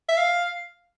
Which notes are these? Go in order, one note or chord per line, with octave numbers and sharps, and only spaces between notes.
E5
F5